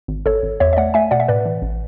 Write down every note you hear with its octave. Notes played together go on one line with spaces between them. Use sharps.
G#1
G#1 A4 C#5
G#1
E2 C#5 E5
E5
A3 D5 F#5
A3 E5 G#5
B2 D5 F#5
E5
A2 B4 D5
E3
A1